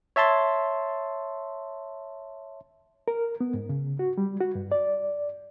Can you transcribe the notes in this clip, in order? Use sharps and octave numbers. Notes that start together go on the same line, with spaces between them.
C#5 E5 A5 C6 A6
A#4
B3
G#2
C#3
F#4
G3
F#4
G2
D5